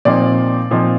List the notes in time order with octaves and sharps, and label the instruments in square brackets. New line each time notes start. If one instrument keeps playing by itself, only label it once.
[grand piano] A#2 F3 C4 D#4 D5
A#2 F3 C4 D#4